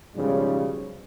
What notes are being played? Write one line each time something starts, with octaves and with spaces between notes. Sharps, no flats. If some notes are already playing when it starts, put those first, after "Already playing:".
B1 G#2 C#3 F3 G3